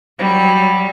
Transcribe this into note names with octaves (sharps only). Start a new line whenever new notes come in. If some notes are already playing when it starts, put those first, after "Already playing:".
F#3 G3